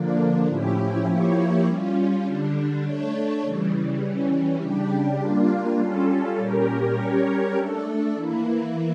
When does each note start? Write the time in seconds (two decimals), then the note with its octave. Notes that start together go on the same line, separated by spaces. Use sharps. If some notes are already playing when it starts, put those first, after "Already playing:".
Already playing: D3 F3 A#3 D4
0.47 A2 F3 C#4 E4 G4
1.06 F3 A#3 E4 G4 C#5
1.65 G3 C#4 F4
2.24 D3 G3 D4
2.83 A3 D4 A4 C#5
3.42 C#3 E3 G3
4.01 E3 G3 C#4
4.60 C#3 G3 D4 G4
5.19 G3 A#3 D4 F4
5.78 G3 C#4 F4 A4
6.37 A#2 G3 C#4 G4 A#4
6.96 G3 C#4 G4 A#4 C#5
7.55 A3 D4 A4
8.15 E3 A#3 E4